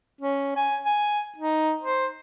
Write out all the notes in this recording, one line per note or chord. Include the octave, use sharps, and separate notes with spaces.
C#4
G#5
G#5
D#4
C5